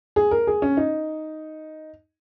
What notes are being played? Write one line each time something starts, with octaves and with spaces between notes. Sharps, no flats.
G#4
A#4
G#4
C#4
D#4